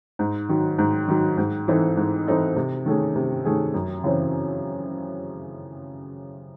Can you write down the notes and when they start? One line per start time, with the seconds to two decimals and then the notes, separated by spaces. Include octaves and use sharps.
0.19 G#2
0.49 D#3 F#3
0.78 G#2
1.08 D#3 F#3
1.38 G#2
1.68 E3 C4 D#4 A4
1.97 G#2
2.27 E3 C4 D#4 A4
2.56 C3
2.86 D#3 A3 C#4 G#4
3.16 C3
3.45 D#3 A3 C#4 G#4
3.74 F#2
4.04 C#3 E3 C4